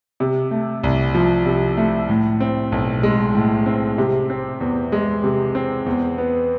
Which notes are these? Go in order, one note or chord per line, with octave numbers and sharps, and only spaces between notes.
C3
A3
C2
F3
C3
A3
A2
C4
B1
G#3
A2
C4
C3
C4
E2
G#3
C3
C4
E2
B3